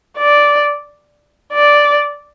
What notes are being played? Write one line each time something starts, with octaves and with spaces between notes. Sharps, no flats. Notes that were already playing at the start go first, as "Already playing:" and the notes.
D5
D5